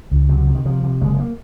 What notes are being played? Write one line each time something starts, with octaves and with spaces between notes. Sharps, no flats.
C#2
C3 F#3
C3
D#3
C3 F3
C3
F#1 G#3
A#3